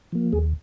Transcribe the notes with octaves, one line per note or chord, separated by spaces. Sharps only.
F3 A#3
D#2 G#4